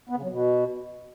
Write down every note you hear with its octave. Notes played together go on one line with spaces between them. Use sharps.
B3
C#3
F#3
B2